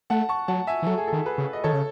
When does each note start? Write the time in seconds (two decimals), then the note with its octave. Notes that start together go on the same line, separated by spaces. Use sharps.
0.10 A3 F#5 A5
0.29 A5 C#6
0.48 F#3 F#5 A5
0.67 E5 G#5
0.83 E3
0.87 F#3 A4
0.98 G#4
1.07 A4
1.13 D#3
1.26 G#4 B4
1.38 C#3
1.53 D#5
1.64 D#3 A4 C#5
1.73 C#3